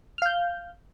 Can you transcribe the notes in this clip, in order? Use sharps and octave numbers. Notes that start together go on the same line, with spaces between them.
F5 F6 G6